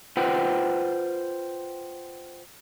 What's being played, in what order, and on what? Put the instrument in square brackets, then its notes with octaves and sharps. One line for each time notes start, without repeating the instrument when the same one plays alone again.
[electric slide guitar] F4 B4 C5 F#5 G5